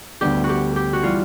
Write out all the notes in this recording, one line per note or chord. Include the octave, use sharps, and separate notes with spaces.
D2 D3 G3 B3 D4 G4
F#4
G4
G4
F#4
E3 G3 F4